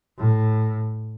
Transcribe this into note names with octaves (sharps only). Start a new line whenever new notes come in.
A2